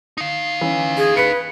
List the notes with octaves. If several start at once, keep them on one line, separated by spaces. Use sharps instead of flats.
D#4 F5
E3 C#4
G#4
B4 C#7